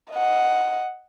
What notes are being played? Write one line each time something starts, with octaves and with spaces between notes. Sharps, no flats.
D#5 F#5